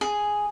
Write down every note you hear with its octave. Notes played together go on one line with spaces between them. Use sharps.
G#4